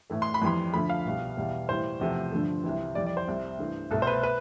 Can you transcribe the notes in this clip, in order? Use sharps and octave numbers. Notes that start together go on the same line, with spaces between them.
A2 E3 A3
C6
B5
F2 E3 G3 C6
D2 D3 F3 A3 B5
F5
C2 B2 G3
E2 B2 G3
A2 E3 G3 C5
E2 C3 F3 A3
G2 D3 F3 A3
C2 C3 E3
F2 E3 G3 D5
D5
C5
C2 C3 G3
G2 E3 A3
C2 B2 A3 A4
C5
B4
B4